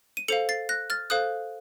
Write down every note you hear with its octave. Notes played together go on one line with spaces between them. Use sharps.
D#7
A4 C5 F5 C#7 F7
A6 C7
F#6 A#6
F6 A6
A4 C5 F5 D#6 F#6